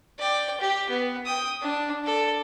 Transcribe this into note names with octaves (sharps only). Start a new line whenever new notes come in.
D5 G5
G4
B3
G5 D#6
D4
A4 D5